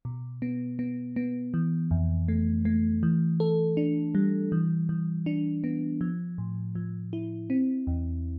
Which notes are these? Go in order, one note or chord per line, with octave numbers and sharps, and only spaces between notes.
B2
B3
B3
B3
E3
F2
A3
A3
E3
A4
D4
G3
E3
E3
D4
B3
F3
A2
F3
E4
C4
E2